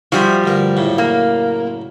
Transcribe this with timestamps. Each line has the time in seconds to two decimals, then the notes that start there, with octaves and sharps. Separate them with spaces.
0.12 F3 G3 F#4 G#4 E5
0.44 D2 G2 A#4
0.77 F#2 A2 C#3
0.98 A#3